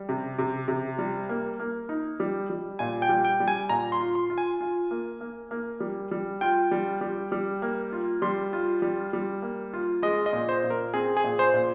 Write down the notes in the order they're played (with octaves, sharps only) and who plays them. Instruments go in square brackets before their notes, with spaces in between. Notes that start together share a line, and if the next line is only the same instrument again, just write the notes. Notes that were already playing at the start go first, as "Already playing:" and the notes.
Already playing: [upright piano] G3
C3
C3
C3
G3
A#3
A#3
D#4
G3
G3
[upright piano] A#2 [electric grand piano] G#5
[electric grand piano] G5
[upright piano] G3
[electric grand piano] G5
[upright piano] G3
[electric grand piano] G#5
[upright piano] A#2 [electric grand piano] A#5
[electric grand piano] C6
[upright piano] F4
[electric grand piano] C6
[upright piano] F4
[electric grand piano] G#5
[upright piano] F4
A#3
A#3
A#3
G3
G3
[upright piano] F4 [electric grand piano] G5
[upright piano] G3
G3
G3
A#3
F4
[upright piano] G3 [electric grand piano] C6
[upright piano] F4
G3
G3
A#3
F4
[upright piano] G#3 [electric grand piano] D#5
[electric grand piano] D#5
[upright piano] A#2
[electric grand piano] C5
[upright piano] A#2
[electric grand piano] A#4
[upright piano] C4 [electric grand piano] G#4
[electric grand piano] G#4
[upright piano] A#2
[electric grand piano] C5
[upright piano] A#2